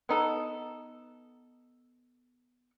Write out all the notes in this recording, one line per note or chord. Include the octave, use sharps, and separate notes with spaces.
B3 D#4 A4